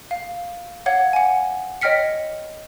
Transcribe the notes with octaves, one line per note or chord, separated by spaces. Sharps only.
F5
C#5 F5 F#5 G#6
F#5 G#5
C#5 D#5 G5 F6 B6 C#7